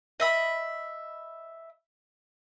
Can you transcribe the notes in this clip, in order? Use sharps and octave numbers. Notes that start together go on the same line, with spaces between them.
D#5 E5 B5